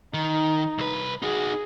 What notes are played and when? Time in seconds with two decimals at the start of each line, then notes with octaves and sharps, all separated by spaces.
0.14 D#3 D#4
0.78 C2 B4
1.22 D#4 F#4 G#4